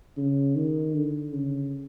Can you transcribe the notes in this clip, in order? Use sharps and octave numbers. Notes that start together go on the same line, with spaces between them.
C#3
D#3
D3
C#3